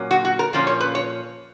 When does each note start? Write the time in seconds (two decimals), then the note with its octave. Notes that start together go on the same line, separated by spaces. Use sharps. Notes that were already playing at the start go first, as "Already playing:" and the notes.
Already playing: A#2 F#3 A#3 C#4
0.11 F#4
0.25 F#4
0.39 A#4
0.53 A#2 F3 A#3 C#4
0.67 C#5
0.80 B4
0.95 C#5